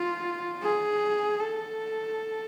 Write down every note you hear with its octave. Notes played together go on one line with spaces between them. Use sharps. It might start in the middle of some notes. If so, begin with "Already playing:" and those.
Already playing: F4
G#4
A4